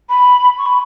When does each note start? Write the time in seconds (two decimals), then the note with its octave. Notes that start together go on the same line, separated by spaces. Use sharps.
0.09 B5
0.58 C#6
0.66 B5